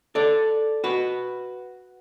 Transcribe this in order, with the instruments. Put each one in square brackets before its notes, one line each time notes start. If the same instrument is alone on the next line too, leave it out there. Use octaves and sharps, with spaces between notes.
[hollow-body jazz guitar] A4 D5
F#4 B4